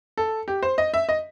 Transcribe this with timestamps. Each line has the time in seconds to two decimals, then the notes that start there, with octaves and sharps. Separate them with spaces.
0.18 A4
0.48 G4
0.63 C5
0.78 D#5
0.94 E5
1.09 D#5